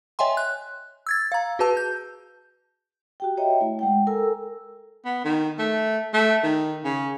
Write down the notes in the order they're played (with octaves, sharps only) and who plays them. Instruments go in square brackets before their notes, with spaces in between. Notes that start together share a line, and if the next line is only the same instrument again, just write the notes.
[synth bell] C#5 D#5 E5 G5 G#5 C6
F#6
E6 G#6 A6
F5 A#5
F#4 G#4 B4 A5 E6
G6
[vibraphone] F#4 G4 G5
C#5 D#5 E5 G5 A#5
A3 E4
G#3 F#5 G5
A4 A#4 G#5 A#5 E6
[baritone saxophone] B3
D#3
A3
A3
D#3
C#3